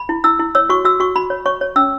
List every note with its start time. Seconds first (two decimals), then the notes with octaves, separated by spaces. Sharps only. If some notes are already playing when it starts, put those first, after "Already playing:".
Already playing: B5
0.09 E4
0.24 E4 E6
0.40 E4
0.55 C#5 E6
0.69 F#4 C#6
0.85 F#4 E6
1.00 F#4 C#6
1.16 F#4 B5
1.30 C#5
1.46 C#5 C#6
1.61 C#5
1.76 C#4 E6